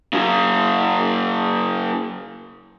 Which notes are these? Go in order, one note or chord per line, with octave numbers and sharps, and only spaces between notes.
C#3 F#3